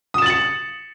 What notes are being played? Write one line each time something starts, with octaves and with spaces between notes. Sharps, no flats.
D#6 A6 C#7 E7 F#7